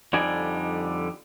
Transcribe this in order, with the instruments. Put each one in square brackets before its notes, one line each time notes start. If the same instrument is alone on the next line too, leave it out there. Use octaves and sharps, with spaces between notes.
[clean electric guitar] F2 D3 G3 D#4 D5 G#5